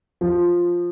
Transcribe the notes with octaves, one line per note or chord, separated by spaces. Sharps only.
F3